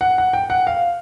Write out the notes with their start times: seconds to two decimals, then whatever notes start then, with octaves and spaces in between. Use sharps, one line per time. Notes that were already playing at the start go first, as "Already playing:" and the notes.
0.01 F#5
0.18 F#5
0.33 G5
0.50 F#5
0.67 F5